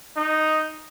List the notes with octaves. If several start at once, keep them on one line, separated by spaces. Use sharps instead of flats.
D#4